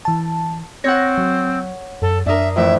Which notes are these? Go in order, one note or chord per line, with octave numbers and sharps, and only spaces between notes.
E3 A5
C4 C#5 F#5 A#6
F#3
F#2 A4
F#2 D4 A#4 E5 D#6
F2 A2 E3 E5